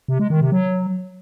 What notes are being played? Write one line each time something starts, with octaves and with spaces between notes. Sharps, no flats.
C3
G#3
D#3
C3
F#3